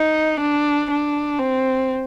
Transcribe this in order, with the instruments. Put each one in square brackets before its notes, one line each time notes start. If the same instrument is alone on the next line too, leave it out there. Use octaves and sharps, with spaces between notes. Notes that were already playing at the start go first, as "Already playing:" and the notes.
Already playing: [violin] D#4
D4
D4
C4